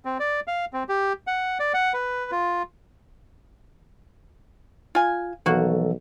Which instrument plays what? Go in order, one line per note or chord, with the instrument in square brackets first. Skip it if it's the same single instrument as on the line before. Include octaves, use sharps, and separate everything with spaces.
[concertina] C4
D5
F5
C4
G4
F#5
D5
F#5
B4
F4
[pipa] F4 G#5
[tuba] B1 [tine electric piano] E3 F3 A4 [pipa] A#3 F#4